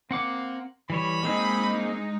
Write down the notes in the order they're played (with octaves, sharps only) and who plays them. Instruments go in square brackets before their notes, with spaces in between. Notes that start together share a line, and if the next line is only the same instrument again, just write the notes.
[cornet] A#3 [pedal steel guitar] C4 F#5 D6
[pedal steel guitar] E3 G3 C#5 [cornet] B5
[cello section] G#3 D#4 [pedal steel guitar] A#3 C4 G#4